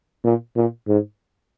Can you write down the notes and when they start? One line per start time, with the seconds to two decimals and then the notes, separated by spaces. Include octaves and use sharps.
0.24 A#2
0.56 A#2
0.88 G#2